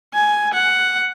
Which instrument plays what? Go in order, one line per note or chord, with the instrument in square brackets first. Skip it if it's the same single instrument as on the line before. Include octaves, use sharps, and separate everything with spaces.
[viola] G#5
F#5